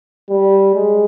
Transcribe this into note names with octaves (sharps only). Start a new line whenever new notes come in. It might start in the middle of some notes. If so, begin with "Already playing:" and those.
G3
G#3